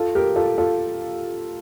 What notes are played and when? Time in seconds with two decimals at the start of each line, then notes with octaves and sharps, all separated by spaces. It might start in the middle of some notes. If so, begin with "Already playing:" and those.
Already playing: F4 A4
0.15 G4 A#4
0.36 F4 A4
0.58 F4 A4